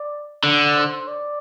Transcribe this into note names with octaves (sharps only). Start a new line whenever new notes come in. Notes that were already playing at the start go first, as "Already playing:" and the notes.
Already playing: D5
D3
C5
D5